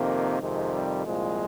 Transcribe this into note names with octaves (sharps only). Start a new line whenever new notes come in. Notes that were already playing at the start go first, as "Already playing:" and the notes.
Already playing: F2 C3 D#3 A#3
F2 C3 D#3 G#3
G3
C2 A#2 F3 G#3